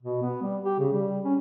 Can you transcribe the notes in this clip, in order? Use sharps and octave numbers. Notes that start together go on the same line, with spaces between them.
B2
B3
G3
G4
C#3
G3
C#4